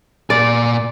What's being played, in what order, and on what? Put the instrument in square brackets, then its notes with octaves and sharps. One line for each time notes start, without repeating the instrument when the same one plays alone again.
[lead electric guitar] A#2 G#5 [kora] D5